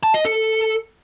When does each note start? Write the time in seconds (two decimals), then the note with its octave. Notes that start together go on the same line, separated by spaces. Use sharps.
0.03 A5
0.14 D#5
0.25 A4